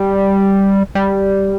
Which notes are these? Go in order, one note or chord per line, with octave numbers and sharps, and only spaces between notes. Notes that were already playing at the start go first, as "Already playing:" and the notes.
Already playing: G3
G3